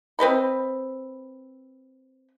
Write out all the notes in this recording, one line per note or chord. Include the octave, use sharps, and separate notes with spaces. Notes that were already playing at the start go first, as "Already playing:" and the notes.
C4 B4 D#5 B5